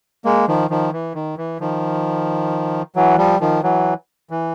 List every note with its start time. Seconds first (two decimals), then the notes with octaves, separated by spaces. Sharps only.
0.25 G#3 A#3
0.48 D#3 F3
0.70 D#3 F3
0.93 E3
1.15 D#3
1.38 E3
1.61 D#3 F3
2.96 E3 F#3
3.18 F3 G3
3.40 D#3 F3
3.63 E3 F#3
4.31 E3